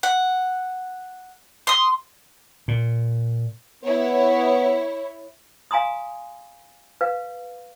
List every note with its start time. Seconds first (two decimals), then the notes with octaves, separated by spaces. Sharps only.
0.03 F#5
1.67 C6 D#6
2.68 A#2
3.83 B3 E4 B4 C#5
5.71 F5 G#5 A#5 C6 D#6
7.01 B4 F5